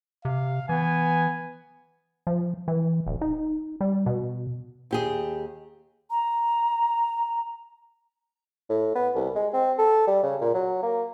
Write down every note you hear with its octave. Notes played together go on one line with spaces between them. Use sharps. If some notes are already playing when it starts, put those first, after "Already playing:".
C3 F5
E3 B3 G#5
F3
E3
D1
D#4
G3
B2
D#2 G4 G#4
A#5
A2
B3
C2
G#3
C4
A4
G3
C#3
A#2
F#3
A#3